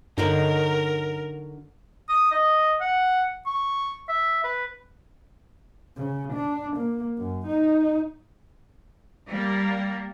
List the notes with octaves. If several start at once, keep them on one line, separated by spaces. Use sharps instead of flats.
G2 D3 F#3 D#4 A#4
D#6
D#5
F#5
C#6
E5
B4
C#3
D4
A#3
F#2
D#4
G3 A#3